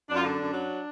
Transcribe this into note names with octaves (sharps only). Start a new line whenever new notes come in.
F#2 D4
F4
D3 D4
F#2
F#3